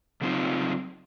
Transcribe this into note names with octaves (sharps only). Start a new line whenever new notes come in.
C#3 F#3 C4 D#4 F4